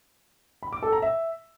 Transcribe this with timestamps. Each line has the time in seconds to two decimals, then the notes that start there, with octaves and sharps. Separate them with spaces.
0.63 B5
0.73 D6
0.82 A4
0.92 A#5
1.02 E5